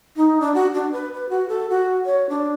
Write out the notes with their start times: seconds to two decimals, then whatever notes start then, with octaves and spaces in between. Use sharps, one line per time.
0.17 D#4
0.41 D4
0.55 F#4
0.74 D4
0.92 B4
1.14 B4
1.29 F#4
1.49 A4
1.70 F#4
2.06 C#5
2.29 D4